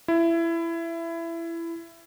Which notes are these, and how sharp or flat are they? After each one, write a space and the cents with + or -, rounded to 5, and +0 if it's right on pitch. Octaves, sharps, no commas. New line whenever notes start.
E4 +20